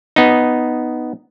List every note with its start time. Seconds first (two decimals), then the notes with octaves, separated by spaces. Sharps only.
0.16 B3 D#4